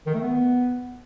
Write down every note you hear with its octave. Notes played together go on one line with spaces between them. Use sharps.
D#3
A3
B3